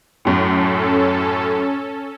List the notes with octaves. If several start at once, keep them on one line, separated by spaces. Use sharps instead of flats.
F#2 A2 C#4 A4